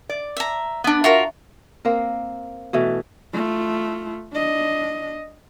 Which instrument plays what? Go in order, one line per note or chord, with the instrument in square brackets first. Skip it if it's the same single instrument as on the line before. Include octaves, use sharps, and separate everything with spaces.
[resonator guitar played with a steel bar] D5
[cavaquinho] E5 A#5
[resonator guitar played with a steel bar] B3 D4
[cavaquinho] F4 F#4 A#4 [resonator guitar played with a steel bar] E5
[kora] A#3 C4 A#4
B2 E3 A3
[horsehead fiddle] A3 F4
D4 D#5